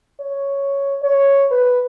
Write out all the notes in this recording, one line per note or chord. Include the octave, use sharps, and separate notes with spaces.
C#5
C#5
B4